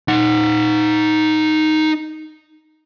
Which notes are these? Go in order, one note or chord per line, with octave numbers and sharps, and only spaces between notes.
D#4 F#5